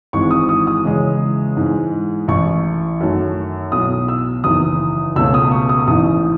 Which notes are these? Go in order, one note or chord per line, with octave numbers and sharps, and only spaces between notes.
G#1 G#2 E3 G#3 C#6
D#6
D#6
D#6
E2 C#3 G#3 C#4
G#2 E3 G#3
A1 A2 E3 C#6
F#2 D#3 A3
B1 A2 F#3 D#6
E6
F#1 E2 D#3 D#6
C#2 B2 A3 C#4 E6
D#6
C#6
D#6
A1 G#2 E3 D#6